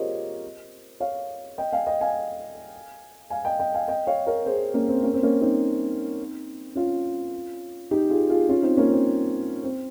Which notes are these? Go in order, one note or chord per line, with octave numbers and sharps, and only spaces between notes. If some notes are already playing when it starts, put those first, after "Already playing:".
Already playing: F4 G4 G#4 A#4 C5 C#5 D#5
C#5 F5
D#5 G5
F5 G#5
D#5 G5
F5 G#5
F5 G#5
D#5 G5
D#5 G5
F5 G#5
D#5 G5
C#5 F5
A#4 C#5
G#4 C5
A#3 C#4
C4
A#3 C#4
C4
A#3 C#4
C4 D#4
C#4 F4
D#4 G4
F4 G#4
F4 G#4
C#4 F4
C4 D#4
A#3 C#4
C4
C4